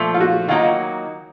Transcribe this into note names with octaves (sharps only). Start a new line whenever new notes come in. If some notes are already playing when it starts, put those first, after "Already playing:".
Already playing: A#2 F3 A3
F4
F#4
D#3 F#3 A#3 D#4 F4 F#4